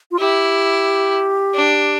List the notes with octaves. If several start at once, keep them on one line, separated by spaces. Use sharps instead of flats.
F4
E4 G4
D4